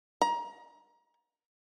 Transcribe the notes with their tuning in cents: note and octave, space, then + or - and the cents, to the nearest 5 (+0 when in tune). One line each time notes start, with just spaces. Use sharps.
A#5 +25